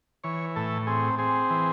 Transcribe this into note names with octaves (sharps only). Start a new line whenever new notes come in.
E3 C#5
A2 A4
C4 G#4
C4 G#4
E3